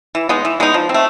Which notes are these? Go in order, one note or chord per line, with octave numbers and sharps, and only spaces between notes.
E3
G#3 B3 D#4
E3
G#3 B3 D#4
F3
C4
A3